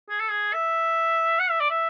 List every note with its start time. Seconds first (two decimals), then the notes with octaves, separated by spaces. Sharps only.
0.10 G#4
0.20 A4
0.30 G#4
0.53 E5
1.39 F#5
1.50 E5
1.60 D5
1.70 E5